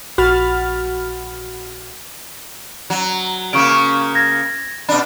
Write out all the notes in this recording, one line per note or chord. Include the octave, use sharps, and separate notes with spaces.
A#1 F#4 B5 F6 A6
F#3
C#3 A#3 C#6 D7
C#6
G#6 A#6
B2 D4 B5